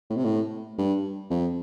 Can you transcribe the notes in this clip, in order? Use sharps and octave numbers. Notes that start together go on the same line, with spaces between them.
A2
C3
A2
G2
F2